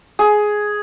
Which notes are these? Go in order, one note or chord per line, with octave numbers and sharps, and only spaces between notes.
G#4